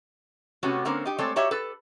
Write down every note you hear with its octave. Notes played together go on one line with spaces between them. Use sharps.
C3 A3 B3 C#4 F#4 G4
D3 A#3 C4 C#4 A#4 C5
D#4 G4
G#3 A3 C4 A4 C#5 D5
D#4 F#4 G4 C#5 E5
A4 B4